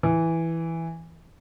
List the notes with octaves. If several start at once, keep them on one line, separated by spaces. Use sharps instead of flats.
E3